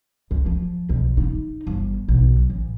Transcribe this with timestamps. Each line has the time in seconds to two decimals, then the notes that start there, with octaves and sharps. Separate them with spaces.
0.31 C#2
0.46 F3
0.89 B1
1.17 D#4
1.67 G1
2.08 B1
2.50 A1